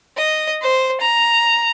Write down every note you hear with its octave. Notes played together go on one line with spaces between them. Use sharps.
D#5
C5
A#5